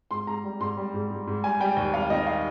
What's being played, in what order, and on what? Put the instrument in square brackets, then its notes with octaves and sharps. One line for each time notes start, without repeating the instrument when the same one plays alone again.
[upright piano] G#2 C6
G#2 A#5
G3
G#2 C6
G3
G#2
G#2
G#2
G3 G#5
G3 G5
D#2 G5
G3 F5
D#3 D#5
F5